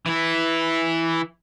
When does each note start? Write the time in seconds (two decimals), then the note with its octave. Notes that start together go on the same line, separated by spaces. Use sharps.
0.06 E3 E4